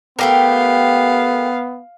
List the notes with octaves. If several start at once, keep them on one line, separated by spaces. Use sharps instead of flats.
A3 B3 G4 A#4 F5